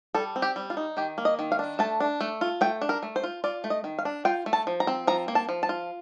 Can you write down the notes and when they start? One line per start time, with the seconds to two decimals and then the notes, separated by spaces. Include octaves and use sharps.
0.15 G3 A4
0.36 C4
0.42 G4
0.56 G3
0.70 F4
0.77 D#4
0.97 D#3 G4
1.18 A#3
1.25 D#5
1.39 D#3
1.52 F5
1.59 D4
1.79 A3 A5
2.00 D4
2.21 A3
2.41 F4
2.61 A3 G5
2.81 D4
2.89 A#4
3.03 A3
3.16 C5
3.23 F4
3.44 F4 D5
3.64 A3
3.70 D#5
3.84 D#3
3.98 F5
4.05 D4
4.25 F4 G5
4.46 A3
4.53 A5
4.67 F3
4.80 A#5
4.87 C4
5.07 F3 A#5
5.28 A#3
5.35 A5
5.49 F3
5.63 A5
5.69 F4